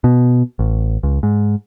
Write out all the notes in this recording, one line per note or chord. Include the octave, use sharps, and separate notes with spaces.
B2
A1
C#2
G#2